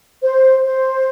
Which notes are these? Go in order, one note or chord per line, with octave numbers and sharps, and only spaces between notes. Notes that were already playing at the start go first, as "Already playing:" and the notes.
C5
C5